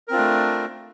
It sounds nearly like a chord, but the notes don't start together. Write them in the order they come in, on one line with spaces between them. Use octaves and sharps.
A#4 C4 F4 D4 A3